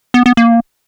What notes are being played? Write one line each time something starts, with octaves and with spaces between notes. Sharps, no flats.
B3
B3
A#3